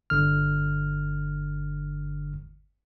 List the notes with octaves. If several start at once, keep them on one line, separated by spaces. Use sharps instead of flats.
G1 D3 F6